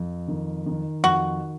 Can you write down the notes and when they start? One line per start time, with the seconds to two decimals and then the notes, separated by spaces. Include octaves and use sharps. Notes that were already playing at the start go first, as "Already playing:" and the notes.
Already playing: F2
0.28 D#3
0.66 D#3
1.04 F2 F#4